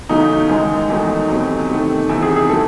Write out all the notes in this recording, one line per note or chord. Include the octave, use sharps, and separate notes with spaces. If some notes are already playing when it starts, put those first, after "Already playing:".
E2 C#3 F#3 A3 D#4
F#2 D#3 G#3 D#4
E2 D#3 F#3 A3
E2 C3 F#3 A3
C3 D#3 A3
E2 C3 D#3 E4
G#4
G#4
F#3 A3 A4